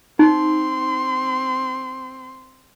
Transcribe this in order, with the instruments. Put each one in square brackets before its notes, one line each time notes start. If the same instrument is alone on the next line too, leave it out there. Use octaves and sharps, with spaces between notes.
[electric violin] C4 C6 [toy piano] D#4